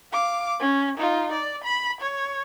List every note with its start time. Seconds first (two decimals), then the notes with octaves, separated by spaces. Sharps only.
0.12 F5 D6
0.60 C#4
0.98 D#4 F4
1.32 D5
1.64 B5
2.01 C#5